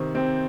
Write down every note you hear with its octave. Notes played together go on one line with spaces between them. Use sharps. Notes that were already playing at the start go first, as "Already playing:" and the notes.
Already playing: C3 D#3
C3 C4